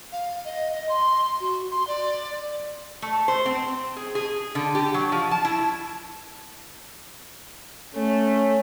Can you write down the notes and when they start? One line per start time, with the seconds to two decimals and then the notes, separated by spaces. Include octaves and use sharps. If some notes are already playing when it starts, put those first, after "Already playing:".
0.12 F5
0.45 D#5
0.74 D#5
0.89 C6
1.41 F#4
1.71 C6
1.87 D5
3.02 A3
3.28 C5
3.46 C4
3.96 G#4
4.15 G#4
4.55 D3
4.75 G4
4.94 F#3
5.12 F3
5.31 A5
5.45 E4
7.95 A3 C#4